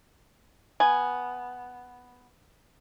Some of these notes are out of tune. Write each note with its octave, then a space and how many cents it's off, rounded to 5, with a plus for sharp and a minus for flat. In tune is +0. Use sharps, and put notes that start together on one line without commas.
B3 +0 G#5 +0